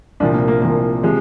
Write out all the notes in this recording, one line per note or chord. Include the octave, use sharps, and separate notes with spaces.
C2 A#2 F3 D4
A#3
A#3
C2 A#2 F3 A#3
C3 F3 G#3